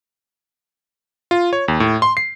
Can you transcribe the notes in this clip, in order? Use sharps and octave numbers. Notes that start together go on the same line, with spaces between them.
F4
C#5
D#2
A2
C6
C7